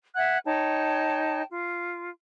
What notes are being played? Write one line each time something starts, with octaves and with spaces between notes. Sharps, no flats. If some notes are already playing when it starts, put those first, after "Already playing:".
E5 F#5 F#6 G#6
D#4 C#5 G5 A5
F4